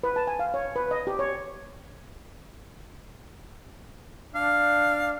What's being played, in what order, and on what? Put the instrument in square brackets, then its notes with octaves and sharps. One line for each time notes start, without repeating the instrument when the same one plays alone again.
[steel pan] B4
A5
G#5
F5
C#5
B4
D#5
G4
C#5
[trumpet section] D4 [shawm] F5